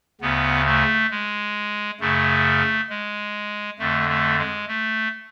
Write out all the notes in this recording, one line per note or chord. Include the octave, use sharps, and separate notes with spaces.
D2 C#3 B3
A3
G#3
F#2 C#3 A3
G#3
F2 D3 A3
A3
G#3
A3